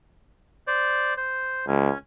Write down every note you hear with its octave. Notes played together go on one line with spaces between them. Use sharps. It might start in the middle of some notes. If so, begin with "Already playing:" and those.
C5 D5
C5
C#2 C#4